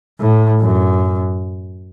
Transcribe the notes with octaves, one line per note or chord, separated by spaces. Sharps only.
A2
F#2